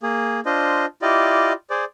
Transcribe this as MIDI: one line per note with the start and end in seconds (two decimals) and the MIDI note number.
0.03 0.40 58
0.03 0.40 68
0.46 0.85 62
0.46 0.85 65
0.46 0.85 72
0.46 0.85 75
1.02 1.53 64
1.02 1.53 65
1.02 1.53 67
1.02 1.53 74
1.02 1.53 75
1.70 1.85 68
1.70 1.85 72
1.70 1.85 74